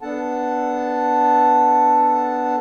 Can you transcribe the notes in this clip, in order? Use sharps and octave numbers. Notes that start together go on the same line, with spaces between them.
B3 D4 A4 F#5 A5